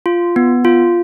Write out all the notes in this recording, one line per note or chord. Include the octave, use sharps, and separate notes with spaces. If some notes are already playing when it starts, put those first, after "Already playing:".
F4
B3
F4